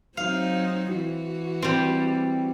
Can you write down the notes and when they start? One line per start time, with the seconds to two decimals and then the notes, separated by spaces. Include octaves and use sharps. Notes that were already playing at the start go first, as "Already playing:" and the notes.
0.17 F#3 C4 D#4 F5
0.94 E3 F#4
1.62 G3 C4